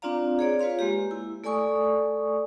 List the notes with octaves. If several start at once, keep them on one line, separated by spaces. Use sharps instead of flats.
C4 D4 F4 D5 F5 A#5
G#4 C#5 D5
F4 B4 C#5 F5 C6
G#3 A#3 G4
E4
A3 A4 D5 G#5 C#6 D#6